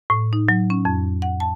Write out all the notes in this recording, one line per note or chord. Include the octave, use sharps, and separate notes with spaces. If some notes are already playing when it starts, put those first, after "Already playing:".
A2
D#4
F#3
C#4
F2
F#5
A5